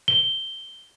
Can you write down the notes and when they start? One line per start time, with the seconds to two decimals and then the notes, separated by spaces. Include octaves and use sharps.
0.08 G7